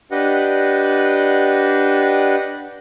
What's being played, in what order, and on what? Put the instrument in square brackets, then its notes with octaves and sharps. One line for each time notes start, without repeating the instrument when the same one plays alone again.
[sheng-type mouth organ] D4 G4 B4 D#5 F#5